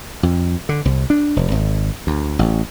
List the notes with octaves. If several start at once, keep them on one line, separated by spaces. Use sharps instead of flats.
F2
D3
C2
D4
F1
G#1
D2
A1